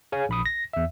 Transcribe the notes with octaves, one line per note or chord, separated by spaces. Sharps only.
G#4 C#5 F5 G#5
A#1 B5 D#6
A#6
E2 E5